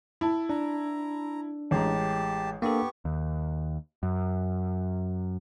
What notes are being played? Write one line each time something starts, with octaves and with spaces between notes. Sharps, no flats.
E4 A5
D4 A#5
A1 G#3 G4 A5 A#5
A#3 B3 D4 G4 A4 C#6
D#2
F#2